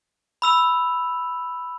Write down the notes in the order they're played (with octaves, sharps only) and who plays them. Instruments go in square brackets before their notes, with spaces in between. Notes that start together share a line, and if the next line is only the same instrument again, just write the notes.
[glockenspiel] B5 E6 F7